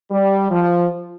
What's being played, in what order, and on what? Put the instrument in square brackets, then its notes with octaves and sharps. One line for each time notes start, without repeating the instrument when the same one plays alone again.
[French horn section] G3
F3